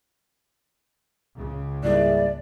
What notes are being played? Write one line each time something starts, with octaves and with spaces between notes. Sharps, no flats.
C#2 C#3
G#2 G3 A#3 E4 G#4 D5